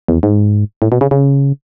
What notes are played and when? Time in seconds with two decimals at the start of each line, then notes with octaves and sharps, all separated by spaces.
0.08 E2
0.23 G#2
0.82 A2
0.92 B2
1.01 C#3
1.11 C#3